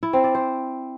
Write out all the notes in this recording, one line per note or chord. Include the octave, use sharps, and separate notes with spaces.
E4
C4
D5
C5